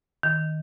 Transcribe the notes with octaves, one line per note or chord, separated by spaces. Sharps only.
D#3